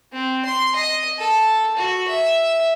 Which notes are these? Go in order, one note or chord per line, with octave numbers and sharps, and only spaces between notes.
C4
C6
D#5
A4
F#4
E5